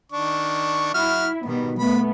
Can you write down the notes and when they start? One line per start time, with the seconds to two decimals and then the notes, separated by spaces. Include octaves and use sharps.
0.12 D#3 D4 C#6
0.94 F#3 E4 F#4 F6
1.46 B2 D#3 G3 B3
1.79 A3 B3 B5